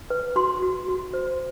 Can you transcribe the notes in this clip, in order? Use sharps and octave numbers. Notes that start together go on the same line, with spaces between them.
B4
F#4 C6
F#4
F#4
C5